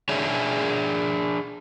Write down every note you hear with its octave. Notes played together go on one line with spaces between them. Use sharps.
D4 G#4 C#5 E5